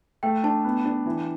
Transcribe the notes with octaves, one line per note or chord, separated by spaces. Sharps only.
A3 G5
D4 A5
B3
D4
E3